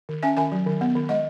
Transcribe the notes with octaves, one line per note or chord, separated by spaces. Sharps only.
D#3
C#4 E5 G#5
D#3 E5 G#5
F#3
D#3
B3
D#3
G#3 D#5 F#5